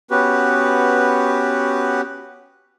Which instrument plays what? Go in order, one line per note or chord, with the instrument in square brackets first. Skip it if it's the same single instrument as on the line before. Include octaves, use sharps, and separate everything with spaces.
[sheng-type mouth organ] B3 C#4 F#4 G4 B4